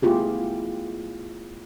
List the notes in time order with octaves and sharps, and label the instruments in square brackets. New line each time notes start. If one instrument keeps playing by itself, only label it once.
[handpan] A3 B3 E4 F4 G4 G#4